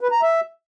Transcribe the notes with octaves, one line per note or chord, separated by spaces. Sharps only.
B4
A#5
E5